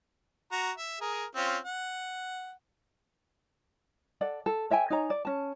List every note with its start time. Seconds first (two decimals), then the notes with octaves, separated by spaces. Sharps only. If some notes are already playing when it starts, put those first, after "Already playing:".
0.52 F#4 A#5
0.78 E5
1.01 G#4 A#4
1.35 C4 C#4 F4
1.65 F#5
4.21 A4 D5 F#5
4.46 A4
4.70 C#5 E5 G5 G#5
4.90 D#4 C#5 G#5 A#5
5.10 D5
5.25 C#4 A5